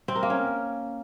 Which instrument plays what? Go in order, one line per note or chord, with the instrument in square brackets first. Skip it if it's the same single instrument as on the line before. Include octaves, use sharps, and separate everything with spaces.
[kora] C4
A#4
A#3
C#4